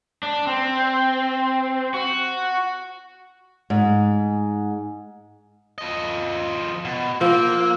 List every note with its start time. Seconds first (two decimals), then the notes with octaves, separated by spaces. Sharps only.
0.23 D4
0.47 C4
1.94 F#4
3.70 G#2
5.78 F3 D#5
6.85 B2
7.21 F3 A#3 E6